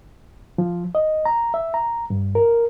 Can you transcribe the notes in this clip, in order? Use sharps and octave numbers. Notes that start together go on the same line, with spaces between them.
F3
D#5
A#5
E5
A#5
G2
A#4